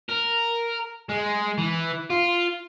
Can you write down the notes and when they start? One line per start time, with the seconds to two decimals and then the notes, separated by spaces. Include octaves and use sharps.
0.09 A#4
1.09 G#3
1.58 E3
2.10 F4